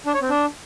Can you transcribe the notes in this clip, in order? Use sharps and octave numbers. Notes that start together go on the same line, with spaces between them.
D4
C#5
C4
D4